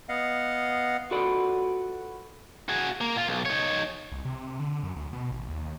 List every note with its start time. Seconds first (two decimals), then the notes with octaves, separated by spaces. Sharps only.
0.09 B3 D#5 F5 F#5
1.11 F4 F#4 A4 B4 D5 F#5
2.69 F#4 G#4
3.01 A#3
3.15 A#2 F4
3.27 B1
3.45 D#4 C#5
4.12 C2
4.25 C3
4.59 D3
4.83 F#2
4.96 D2
5.13 B2
5.31 A1
5.48 D#2